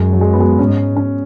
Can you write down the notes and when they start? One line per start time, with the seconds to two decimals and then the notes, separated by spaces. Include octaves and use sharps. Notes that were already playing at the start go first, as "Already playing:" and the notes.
Already playing: F#2 G#3
0.13 F#3
0.21 G#3
0.33 B3
0.40 G#3
0.59 G#2 C#4
0.96 C#4